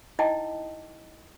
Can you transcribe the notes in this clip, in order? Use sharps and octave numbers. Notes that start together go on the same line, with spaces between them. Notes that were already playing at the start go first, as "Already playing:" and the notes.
D#4 E4 D#5 G5 A5